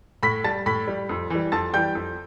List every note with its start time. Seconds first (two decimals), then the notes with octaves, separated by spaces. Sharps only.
0.23 A2 B5 B6
0.44 G3 A5 A6
0.66 A2 B5 B6
0.87 G3
1.09 F2
1.30 E3 G3
1.52 F2 A5 A6
1.74 E3 G3 G5 G6
1.95 F2